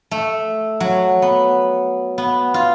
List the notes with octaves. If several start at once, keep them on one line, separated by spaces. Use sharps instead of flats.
A3
F#3
B3
B3
F4